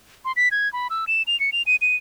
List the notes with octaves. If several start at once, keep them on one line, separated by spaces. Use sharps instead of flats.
C6
B6
G#6
B5
E6
E7
F7
C#7
F7
D#7
D#7